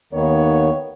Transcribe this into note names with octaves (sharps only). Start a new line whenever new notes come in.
D#2 D#3 B3 C#5